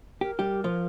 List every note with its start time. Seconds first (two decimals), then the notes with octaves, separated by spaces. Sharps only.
0.21 G4 A#4
0.39 G3 G4
0.64 F3 F4